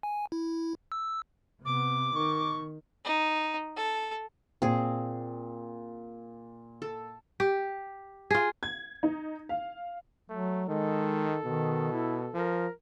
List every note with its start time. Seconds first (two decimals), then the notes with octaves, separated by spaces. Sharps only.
0.03 G#5
0.32 E4
0.92 E6
1.65 C3 B3 D6
2.16 D#3 C#6
3.05 D#4
3.77 A4
4.62 A#2 C4 G#4
6.82 A4
7.40 G4
8.31 F4 G#4
8.63 G#6
9.03 D#4
9.49 F5
10.30 F#3 A3
10.69 D#3 G#3 A4
11.45 B2 D#3
11.92 E4
12.34 F3 A#4